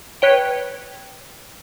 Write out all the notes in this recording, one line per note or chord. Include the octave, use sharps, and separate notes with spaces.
B4 C#5 G5